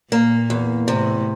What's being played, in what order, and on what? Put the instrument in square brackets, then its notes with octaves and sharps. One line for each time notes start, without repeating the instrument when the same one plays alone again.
[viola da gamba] A#2 [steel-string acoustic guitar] A#3
[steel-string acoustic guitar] E2
[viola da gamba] A2 [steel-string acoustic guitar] C3